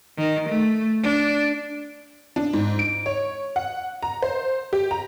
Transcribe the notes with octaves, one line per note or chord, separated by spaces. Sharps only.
D#3
A3
D4
D4
G#2
D7
C#5
F#5
A#5
C5
G4
A#5